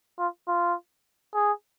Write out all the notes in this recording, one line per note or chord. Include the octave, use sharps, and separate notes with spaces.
F4
F4
G#4